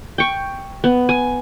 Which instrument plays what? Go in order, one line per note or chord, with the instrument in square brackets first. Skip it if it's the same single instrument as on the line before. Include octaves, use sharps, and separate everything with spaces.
[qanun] G5 C#6
B3
G#5